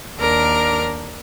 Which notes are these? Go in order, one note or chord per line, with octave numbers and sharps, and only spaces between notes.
D#2 D4 A#4 A#5 F6